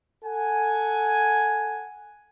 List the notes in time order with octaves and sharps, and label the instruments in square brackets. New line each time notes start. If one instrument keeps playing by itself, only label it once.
[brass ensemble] A4 F#5 G#5